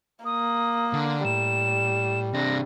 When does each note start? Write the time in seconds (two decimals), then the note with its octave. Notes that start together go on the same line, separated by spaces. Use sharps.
0.25 A#3 D#6
0.93 D3
1.24 A2 G3 E7
2.34 C3 D4 A#6